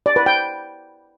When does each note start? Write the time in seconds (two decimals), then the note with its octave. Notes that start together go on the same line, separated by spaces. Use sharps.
0.06 D5
0.16 B4
0.26 G5